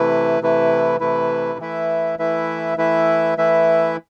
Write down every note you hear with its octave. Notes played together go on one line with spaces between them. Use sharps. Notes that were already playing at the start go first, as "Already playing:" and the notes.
Already playing: C3 E3 A3 E4 B4
C3 E3 A3 E4 B4
C3 E3 A3 E4 B4
E3 A3 E4 B4 E5
E3 A3 E4 B4 E5
E3 A3 E4 B4 E5
E3 A3 E4 B4 E5